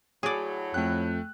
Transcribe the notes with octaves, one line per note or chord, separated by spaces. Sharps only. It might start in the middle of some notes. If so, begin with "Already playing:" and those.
A2 F#3 G#4 D5
F2 A3 G5 F#6